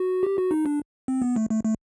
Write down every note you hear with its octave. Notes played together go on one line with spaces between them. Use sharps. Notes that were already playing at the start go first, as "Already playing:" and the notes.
Already playing: F#4
G4
F#4
D#4
D4
C4
B3
A3
A3
A3